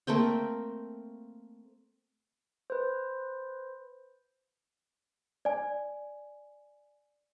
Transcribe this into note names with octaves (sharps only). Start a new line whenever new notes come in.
A3 A#3 C4 G5
B4 C5
D5 G#5